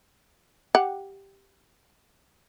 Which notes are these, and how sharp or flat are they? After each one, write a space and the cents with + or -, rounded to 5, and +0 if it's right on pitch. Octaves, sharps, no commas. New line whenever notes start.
G4 +0 F#5 +0